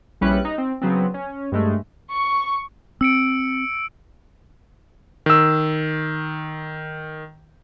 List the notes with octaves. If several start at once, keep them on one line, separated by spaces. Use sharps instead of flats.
A#1 G3 C#4 E4 B4 F#6
D#4
C4
C#3 F#3 B3 C4
C#4
G2 G#3 A3
C#6
C4 E6 C#7 D7
D#3 E6